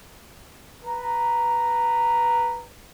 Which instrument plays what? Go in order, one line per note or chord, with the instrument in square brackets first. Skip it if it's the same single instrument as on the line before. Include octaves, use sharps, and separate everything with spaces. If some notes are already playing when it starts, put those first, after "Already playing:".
[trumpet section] B4 A#5